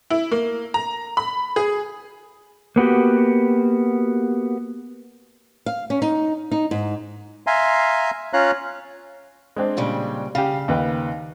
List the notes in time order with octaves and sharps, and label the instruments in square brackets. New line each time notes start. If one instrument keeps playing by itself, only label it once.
[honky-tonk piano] E4
A#3
A#5
B5
G#4
[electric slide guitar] A#3 B3 F#4 G4
[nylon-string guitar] F5
C#4
D#4
D#4
G#2
[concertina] E5 F5 G#5 A#5 C6
C#4 F4 C#5 F5 A#5 F#6
[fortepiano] G#3 C4 D4
[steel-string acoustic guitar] A#2 C#3 G3
[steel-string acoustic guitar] C#3 [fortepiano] G4 F5
[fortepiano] D#2 B4 G5